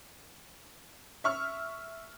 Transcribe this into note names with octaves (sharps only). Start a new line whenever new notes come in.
E5 C#6 F6